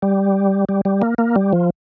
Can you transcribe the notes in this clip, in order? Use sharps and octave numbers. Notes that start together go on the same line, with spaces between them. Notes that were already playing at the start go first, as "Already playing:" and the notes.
G3
G3
G3
A#3
A#3
G3
F3